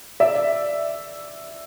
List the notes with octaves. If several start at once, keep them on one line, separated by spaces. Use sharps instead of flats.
D5 E5